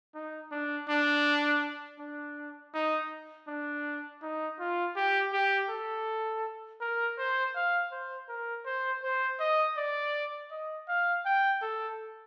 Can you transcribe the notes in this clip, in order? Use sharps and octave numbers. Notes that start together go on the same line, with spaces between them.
D#4
D4
D4
D4
D#4
D4
D#4
F4
G4
G4
A4
A#4
C5
F5
C5
A#4
C5
C5
D#5
D5
D#5
F5
G5
A4